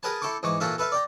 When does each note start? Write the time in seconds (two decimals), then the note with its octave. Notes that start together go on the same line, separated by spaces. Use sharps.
0.03 G#4 A#4 B4 G5 A5
0.22 E4 A4 G5 C#6 D6
0.43 G#2 E3 C#6 D6
0.60 A#2 E3 F#4 A4 E5 F5
0.78 A4 B4 E5 F5
0.92 D5 G5 A#5